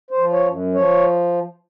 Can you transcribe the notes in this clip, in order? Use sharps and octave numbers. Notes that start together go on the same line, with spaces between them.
C5
F3
C#5
F#2
F3 C#5